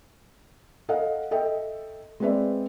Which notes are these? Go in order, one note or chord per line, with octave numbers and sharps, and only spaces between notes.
A4 D#5 F5 F#5
A4 D#5 E5 G5
G#3 C4 G#4 B4 D5 E5